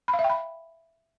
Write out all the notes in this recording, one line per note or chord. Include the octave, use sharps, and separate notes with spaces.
B5
F5
E5
G5
B5